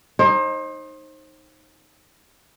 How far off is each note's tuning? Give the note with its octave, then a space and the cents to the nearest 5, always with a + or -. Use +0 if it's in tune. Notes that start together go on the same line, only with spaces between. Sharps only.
D#4 +0 C5 +35